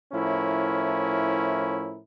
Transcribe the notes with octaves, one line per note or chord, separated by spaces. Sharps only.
A2 F3 C#4 E4 A#4